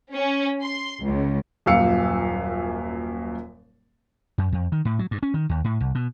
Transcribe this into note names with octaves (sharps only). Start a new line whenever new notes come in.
C#4
C6
C#2
D#1 F#2 A#2 F5 E6 C#7
F#2
F2
D#3
A2
F#3
G2
C#4
D#3
D#2
A2
C2
B2